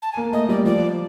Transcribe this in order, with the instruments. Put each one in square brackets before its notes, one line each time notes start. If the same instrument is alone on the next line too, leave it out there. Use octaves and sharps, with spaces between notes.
[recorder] A5
G#5
[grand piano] A#3
[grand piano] A3 [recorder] D#5
[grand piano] G3 [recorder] D5
[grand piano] F3 [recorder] D5